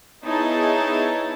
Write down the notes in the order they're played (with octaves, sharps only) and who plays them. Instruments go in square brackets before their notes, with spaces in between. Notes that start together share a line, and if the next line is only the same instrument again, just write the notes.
[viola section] B3 D#4 E4 G#4 C#5 A5